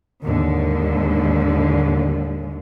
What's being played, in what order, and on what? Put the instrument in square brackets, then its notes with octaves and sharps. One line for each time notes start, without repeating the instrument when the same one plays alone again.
[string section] D#2 G#2 D3